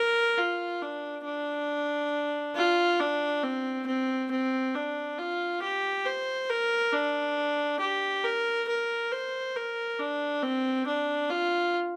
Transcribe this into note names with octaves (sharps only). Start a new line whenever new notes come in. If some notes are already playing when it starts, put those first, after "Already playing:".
Already playing: A#4
F4
D4
D4
F4
D4
C4
C4
C4
D4
F4
G4
C5
A#4
D4
G4
A#4
A#4
C5
A#4
D4
C4
D4
F4